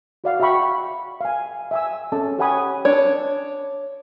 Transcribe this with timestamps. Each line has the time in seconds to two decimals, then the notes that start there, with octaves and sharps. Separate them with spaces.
0.24 F#4 D5 F5 F#5
0.40 F#4 E5 F#5 G5 B5 C#6
1.21 F5 G#5
1.71 E5 G#5 E6
2.12 C#4 A4 A5
2.39 G4 C#5 F#5 G#5 B5 D#6
2.85 D4 C#5